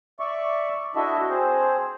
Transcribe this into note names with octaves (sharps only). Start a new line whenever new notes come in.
D5 E5 C#6
D4 E4 F#4 A4 D#5 E5
C4 G#4 C5